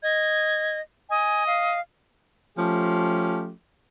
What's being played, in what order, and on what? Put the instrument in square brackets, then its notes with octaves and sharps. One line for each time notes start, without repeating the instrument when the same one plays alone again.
[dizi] D#5 [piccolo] G#6
[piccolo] D#5 [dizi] G#5
[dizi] F5
[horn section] F3 A3 C#4 G4